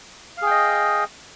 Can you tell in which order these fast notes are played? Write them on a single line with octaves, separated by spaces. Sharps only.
F5 G#4 G5 D#5